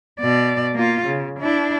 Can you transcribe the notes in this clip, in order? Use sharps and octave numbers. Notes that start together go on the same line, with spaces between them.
B2 D5
A#3 F4
C#3
D4 E4